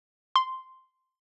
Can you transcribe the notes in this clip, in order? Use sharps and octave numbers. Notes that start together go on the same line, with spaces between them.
C6